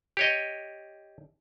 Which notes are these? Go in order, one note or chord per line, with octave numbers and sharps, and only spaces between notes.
G4 C#5 D#5